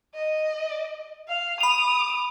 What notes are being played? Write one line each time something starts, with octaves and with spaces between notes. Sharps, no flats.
D#5
F5
B5 D#6 F7